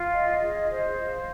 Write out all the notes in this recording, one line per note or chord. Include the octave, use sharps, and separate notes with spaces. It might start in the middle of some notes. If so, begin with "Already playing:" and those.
Already playing: F4
D#5
G#4
C5
F4